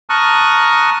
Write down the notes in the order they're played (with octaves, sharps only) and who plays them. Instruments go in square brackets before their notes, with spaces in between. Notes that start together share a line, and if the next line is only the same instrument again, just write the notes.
[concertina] A5 A#5 C#6 D#6 F6 F#6